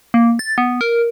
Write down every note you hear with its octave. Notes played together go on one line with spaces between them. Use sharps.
A#3
A6
B3
A#4